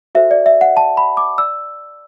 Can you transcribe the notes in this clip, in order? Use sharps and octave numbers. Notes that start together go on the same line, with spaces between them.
F#4 A4 C5 E5
D5
E5
F#5
A5
B5
D6
D5 E6